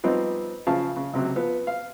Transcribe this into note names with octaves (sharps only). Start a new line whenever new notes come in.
F3 G3 B3 C4 D#4
C#3 F3 F5 A5
C#3
C#2 C3 F#3
F3 B3 B4
F5